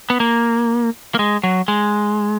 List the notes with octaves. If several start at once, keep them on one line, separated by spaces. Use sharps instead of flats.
B3
A#3
A#3
G#3
F#3
G#3